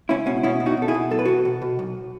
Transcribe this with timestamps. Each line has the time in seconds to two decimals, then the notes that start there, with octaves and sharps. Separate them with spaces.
0.09 C#2 C#4 E4
0.26 B2 C#4
0.43 B2 C#4 E4
0.60 B2
0.66 D#4 F#4
0.77 B2 A4
0.88 E4 G#4
0.94 B2
1.11 B1 A4
1.19 B4
1.25 B2 F#4 A4
1.45 B2
1.62 B2
1.79 B1